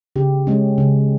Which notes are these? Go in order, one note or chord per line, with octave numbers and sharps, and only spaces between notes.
C#3 G4
G#3 C#4
C#3